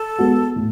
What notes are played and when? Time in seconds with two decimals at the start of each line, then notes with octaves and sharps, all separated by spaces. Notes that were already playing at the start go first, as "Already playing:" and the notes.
Already playing: A4
0.19 G#3 B3 F#4
0.56 A2